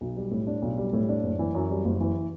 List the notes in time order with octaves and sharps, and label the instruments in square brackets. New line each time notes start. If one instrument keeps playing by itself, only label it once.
[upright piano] B1
G3
A2
D4
B1
G3
A2
D4
F#1
E3
F#2
G3
F#1
E3